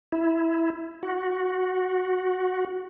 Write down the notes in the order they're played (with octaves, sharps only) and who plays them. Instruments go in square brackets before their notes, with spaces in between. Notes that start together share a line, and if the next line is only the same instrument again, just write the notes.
[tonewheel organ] E4
F#4